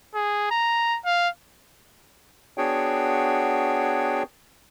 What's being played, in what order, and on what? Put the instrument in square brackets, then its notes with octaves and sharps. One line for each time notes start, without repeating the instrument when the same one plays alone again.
[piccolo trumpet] G#4
A#5
F5
[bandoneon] B3 D4 F#4 G#4 C#5 G5